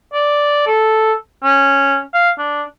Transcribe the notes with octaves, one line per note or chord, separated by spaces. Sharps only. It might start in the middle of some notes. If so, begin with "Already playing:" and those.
D5
A4
C#4
F5
D4